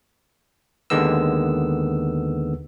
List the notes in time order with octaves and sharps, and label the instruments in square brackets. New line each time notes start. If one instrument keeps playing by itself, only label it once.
[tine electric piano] D#2 D3 D#3 G#3 B3 E6